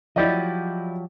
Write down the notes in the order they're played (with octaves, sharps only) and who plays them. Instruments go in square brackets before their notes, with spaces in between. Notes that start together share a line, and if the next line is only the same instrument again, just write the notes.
[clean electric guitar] F3 F#3 G4 [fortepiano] E4 D5 D#5